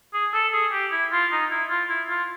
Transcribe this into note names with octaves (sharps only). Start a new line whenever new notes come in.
G#4
A4
G#4
G4
E4
F4
D#4
E4
F4
E4
F4